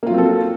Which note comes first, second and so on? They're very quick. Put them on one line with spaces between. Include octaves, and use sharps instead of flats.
A#3 F4 F#3 C4 A4